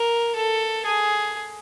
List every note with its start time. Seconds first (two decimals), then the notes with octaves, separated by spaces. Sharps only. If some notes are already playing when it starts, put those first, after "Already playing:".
Already playing: A#4
0.35 A4
0.85 G#4